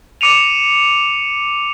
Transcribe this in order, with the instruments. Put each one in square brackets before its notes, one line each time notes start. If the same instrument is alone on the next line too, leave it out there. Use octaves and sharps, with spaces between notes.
[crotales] D6 C#7 D#7 F7